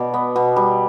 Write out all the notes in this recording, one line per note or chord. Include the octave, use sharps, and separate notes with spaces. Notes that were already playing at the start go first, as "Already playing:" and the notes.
Already playing: B2 D5
B3
B2
G3